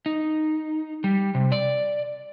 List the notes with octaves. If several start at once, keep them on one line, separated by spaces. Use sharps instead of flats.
D#4
G3
C3
D5